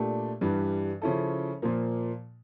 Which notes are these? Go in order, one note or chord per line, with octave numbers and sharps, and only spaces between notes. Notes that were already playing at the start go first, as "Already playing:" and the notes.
Already playing: A#2 A3 D4 G4
G2 E3 G3
C#3 F3 C#4 E4 A4
A#2 F3 A#3